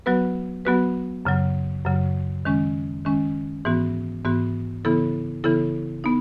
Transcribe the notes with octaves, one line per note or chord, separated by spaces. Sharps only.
F#3 B3 F#4 B4
F#3 B3 F#4 B4
F#2 C#3 F#3
F#2 C#3 F#3
D#3 G#3 C#4
D#3 G#3 C#4
G#2 E3 B3 F#4
G#2 E3 B3 F#4
C#3 E3 B3 E4 A4
C#3 E3 B3 E4 A4
B3 D#4